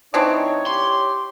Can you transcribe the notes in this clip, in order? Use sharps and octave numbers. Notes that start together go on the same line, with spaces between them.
E3 C4 D4 D#4 C#5
G4 C6